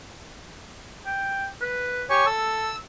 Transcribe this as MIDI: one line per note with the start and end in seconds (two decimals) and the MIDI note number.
1.06 1.47 79
1.62 2.04 71
2.10 2.25 67
2.10 2.26 73
2.10 2.26 80
2.10 2.26 85
2.27 2.72 69
2.27 2.76 88